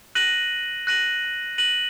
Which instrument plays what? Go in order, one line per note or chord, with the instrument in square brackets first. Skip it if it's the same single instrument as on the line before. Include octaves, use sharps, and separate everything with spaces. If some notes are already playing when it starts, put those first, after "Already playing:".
[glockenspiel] F#6 A#6 D#7 F#7
F#6 A#6 D#7 F#7
F#6 A#6 D#7 F#7